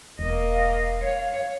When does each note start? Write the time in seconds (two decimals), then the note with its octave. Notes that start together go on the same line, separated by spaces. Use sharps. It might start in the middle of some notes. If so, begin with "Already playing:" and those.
0.19 E1 A#3 D#5
0.52 F5
1.02 C#5